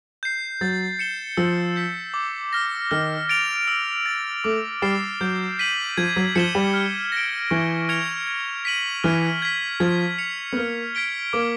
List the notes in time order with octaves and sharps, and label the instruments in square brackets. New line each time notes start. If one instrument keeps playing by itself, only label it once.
[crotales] G6 C7
[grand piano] F#3 [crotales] A6
[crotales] C#7 E7 G7
[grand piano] F3 [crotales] E6
[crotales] G6 B6
D6
F6 A#6
[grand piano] D#3 [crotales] F6
[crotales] A6 D7 F7
E6
A6 D7
[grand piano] A3 [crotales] D6
[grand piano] G3 [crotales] F6 A6 C7 E7
[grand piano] F#3 [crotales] G6
[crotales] B6 D#7 F#7
[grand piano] F3 [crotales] G#6
[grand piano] F#3
[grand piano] F3 [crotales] C#7 E7 G7
[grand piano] G3
[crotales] F6
A#6 D7
[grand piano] E3 [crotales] C#6
[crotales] F6 G#6 C#7 F7
G#6
B6 D#7 F#7
[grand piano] E3 [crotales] F6
[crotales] G#6 B6
[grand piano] F3 [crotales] G#6
[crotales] C#7 F7
[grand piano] B3
[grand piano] A#3 [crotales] F6
[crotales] G#6 B6 D7 G7
[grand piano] A#3 [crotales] D6